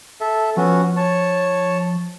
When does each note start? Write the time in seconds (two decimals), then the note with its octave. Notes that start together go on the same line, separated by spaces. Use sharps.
0.21 A4 E5
0.57 F3 B3 C#4 F#4
0.97 C#5 A5